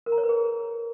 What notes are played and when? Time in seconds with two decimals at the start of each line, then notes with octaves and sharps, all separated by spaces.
0.06 A#4
0.12 A#5
0.18 C#5
0.23 B4
0.29 G#4